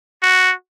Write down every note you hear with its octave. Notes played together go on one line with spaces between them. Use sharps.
F#4